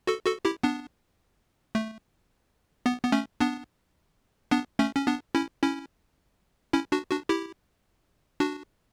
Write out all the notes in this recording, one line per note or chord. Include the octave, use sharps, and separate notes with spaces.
F#4 A4
F#4 A4
E4 G4
B3 D4
A3
B3
B3
A3 C#4
B3 D4
B3 D4
A3 C#4
C#4
B3 D4
C#4 E4
C#4 E4
C#4 E4
D4 F#4
D4 F#4
E4 G4
D4 F#4